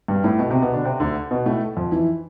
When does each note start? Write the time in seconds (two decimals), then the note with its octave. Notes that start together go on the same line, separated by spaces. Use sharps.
0.08 G2 G3
0.24 A2 A3
0.39 B2 B3
0.50 C3 C4
0.62 B2 B3
0.73 D3 D4
0.85 C3 C4
1.00 D2 D3
1.31 B2 B3
1.46 A2 A3
1.77 F2 F3
1.92 E3 E4